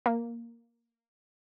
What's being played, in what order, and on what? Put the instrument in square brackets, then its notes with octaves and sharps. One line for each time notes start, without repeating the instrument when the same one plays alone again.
[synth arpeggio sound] A#3